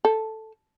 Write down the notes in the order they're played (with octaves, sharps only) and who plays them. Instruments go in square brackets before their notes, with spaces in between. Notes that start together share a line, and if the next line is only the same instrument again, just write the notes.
[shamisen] A4